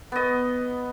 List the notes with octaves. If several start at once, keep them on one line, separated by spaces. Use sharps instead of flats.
B3 D#5